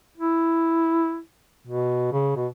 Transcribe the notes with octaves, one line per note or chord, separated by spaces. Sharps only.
E4
B2
C#3
B2